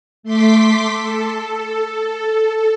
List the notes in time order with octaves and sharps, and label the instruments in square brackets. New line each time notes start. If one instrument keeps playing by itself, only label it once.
[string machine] A3 C6 D6 B6
A4